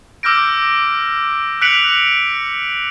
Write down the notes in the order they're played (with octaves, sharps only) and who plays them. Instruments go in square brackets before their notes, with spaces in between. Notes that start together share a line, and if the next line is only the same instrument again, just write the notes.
[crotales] D6 E6 F6 G6 A#6 D7
F#6 B6 C#7 D7 F7 F#7